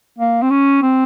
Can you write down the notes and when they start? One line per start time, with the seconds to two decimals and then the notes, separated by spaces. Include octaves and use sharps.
0.18 A#3
0.42 C4
0.50 C#4
0.82 C4